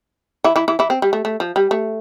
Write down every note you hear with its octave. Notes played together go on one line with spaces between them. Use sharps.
E3 E4
E3 E4
E3 E4
E3 E4
C4
G3
A3
A3
F3
G3
A3